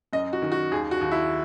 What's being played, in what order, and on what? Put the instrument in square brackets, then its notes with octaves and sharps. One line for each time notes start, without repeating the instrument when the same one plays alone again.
[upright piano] F#2 D#5
F#4
D#3
F#4
D#2 G#4
F#4
D#2
E4